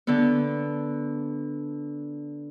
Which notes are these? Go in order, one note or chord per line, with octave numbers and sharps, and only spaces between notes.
D3 B3